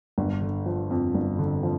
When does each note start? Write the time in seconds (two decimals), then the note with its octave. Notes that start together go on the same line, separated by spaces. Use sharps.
0.18 G1
0.41 D3
0.66 F3
0.91 F2
1.14 G1
1.39 D3
1.63 F3